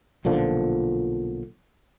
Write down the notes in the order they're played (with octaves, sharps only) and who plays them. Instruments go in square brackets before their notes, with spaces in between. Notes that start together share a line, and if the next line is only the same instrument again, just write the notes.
[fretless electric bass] B1 A#2 D3 F3